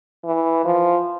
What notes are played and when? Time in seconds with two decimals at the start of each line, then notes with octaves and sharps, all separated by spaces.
0.25 E3
0.65 F3